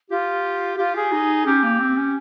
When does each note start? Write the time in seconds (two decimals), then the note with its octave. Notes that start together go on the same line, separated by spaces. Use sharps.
0.10 F4 G4
0.78 F4 G4
0.96 G#4
1.12 D#4
1.46 C#4 G4
1.63 A#3
1.80 C4
1.97 C#4